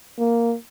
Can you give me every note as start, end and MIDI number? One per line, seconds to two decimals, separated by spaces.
0.18 0.55 58